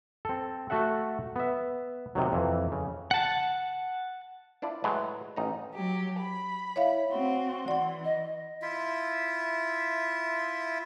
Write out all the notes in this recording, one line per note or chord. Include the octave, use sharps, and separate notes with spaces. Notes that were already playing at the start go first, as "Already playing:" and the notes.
C4 A4
A3 F#4 A4 E5 F#5
B3 E5
C3 D#3 F#3
F2 E3
C#3
F#5 A5
D4 E4 F4 D5
A2 F#3 G#3 B4
A1 D#4 A#5
F#3 G4
B5
E4 C#5 E5 F5
C4 F#4 C6
E3 D5 F#5
D#5
E4 F4 E5